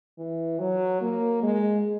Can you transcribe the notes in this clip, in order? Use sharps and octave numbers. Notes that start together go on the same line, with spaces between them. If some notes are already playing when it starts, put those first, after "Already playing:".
E3
F#3
A#3
G#3